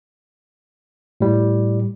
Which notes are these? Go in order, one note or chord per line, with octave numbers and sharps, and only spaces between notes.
A2 G3